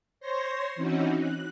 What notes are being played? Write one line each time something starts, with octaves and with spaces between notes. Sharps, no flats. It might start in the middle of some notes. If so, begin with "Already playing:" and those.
C5 C#5 C6 A#6
E3 C4 C#4 D#4 F#4
F#6